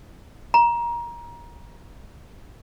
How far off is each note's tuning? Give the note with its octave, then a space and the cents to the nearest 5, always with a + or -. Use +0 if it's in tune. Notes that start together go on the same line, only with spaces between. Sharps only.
A#5 +25